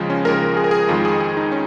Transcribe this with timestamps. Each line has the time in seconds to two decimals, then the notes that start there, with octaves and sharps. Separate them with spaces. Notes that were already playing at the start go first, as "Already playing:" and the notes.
Already playing: D#2 C#3 F3 G#3 F4
0.10 C#4
0.25 D#2 C#3 F3 G#3 A#4
0.57 G#4
0.64 A#4
0.71 G#4
0.88 F2 D#3 G#3 F4
1.05 G#4
1.20 G#4
1.37 D#4
1.52 C#4